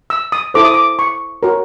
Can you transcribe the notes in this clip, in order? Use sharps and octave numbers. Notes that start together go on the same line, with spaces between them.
E6
D#6
E4 A4 C5 D6
D#6
D6
C#6
F#4 A#4 C#5